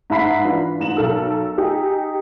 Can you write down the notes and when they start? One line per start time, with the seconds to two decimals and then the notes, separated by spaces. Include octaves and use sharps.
0.10 G#2 E5 A#5 B5 B6 C7
0.44 E3 D4 F4 B4
0.80 G#2 E7 F#7
0.96 B1 A4 A#4 E6
1.58 D#4 G4 G#4